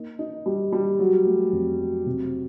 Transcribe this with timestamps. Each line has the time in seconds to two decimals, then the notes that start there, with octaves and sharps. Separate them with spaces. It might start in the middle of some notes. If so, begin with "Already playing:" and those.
Already playing: A#3 D#4
0.19 D#4
0.46 G3
0.72 G3
0.99 F#3
1.26 A3
1.52 F2
1.80 F#3
2.06 C3